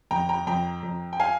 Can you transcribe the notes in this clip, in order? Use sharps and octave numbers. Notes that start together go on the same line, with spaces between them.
F2 G5 A#5
G5 A#5
F2 G5 A#5
F2
G5
F5 G#5